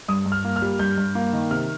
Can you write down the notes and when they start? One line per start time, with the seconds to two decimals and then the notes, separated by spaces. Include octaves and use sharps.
0.08 G2 D#6
0.26 G2
0.32 F6
0.44 A#3
0.56 F6
0.62 G3
0.79 G2 G6
0.98 G2
1.15 A#3
1.33 D#3
1.51 C3 F6